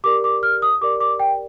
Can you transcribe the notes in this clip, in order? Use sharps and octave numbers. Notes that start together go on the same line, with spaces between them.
G4 A#4 D5 D6
D6
F6
D#6
G4 A#4 D5 D6
D6
G5